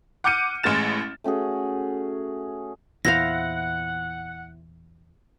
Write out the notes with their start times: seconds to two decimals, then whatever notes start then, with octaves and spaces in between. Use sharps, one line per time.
0.24 F#5 D6 F6 G6 C#7 D#7
0.63 A1 A2 G#3 F6 A6 E7
1.24 A3 C#4 F#4 G#4
3.05 E2 A#2 E3 E4 C5 F5 F#5 A#6